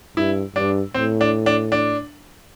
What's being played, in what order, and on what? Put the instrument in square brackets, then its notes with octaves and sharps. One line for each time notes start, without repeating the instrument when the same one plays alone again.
[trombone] G2 [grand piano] E4
[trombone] G2 [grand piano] D4
[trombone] A2 [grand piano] C4
[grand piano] D4
D4
D4